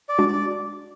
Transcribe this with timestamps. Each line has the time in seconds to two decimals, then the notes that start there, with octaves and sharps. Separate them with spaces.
0.09 D5
0.18 G#3 D4 F#4
0.28 D5